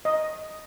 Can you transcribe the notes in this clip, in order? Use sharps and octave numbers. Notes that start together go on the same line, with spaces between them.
D#5